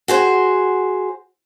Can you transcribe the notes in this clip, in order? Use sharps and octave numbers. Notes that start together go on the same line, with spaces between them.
F#4 G#4 C5